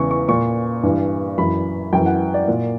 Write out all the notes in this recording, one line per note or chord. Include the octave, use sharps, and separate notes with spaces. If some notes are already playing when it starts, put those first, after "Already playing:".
Already playing: E2 C#3 E3 C#6
C#6
A#2 C#6
G2 E3
F#2 E3 B5
F#2 E3 G5
F#5
D5
A#2